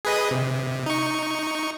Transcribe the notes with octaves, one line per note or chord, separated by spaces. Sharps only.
G#4 B4 D#5
C3
D#4 C#6